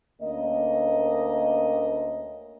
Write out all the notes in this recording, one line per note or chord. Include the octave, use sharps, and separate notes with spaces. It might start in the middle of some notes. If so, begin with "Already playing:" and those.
D2 A#3 C#4 A#4 D#5